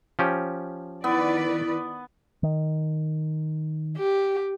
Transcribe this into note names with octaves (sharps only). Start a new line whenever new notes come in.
F3 C#4 G4
D#3 B3 E4 B4 D5
D#3
G4